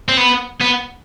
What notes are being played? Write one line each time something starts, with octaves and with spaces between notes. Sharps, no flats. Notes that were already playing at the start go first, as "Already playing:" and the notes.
C4
B3
B3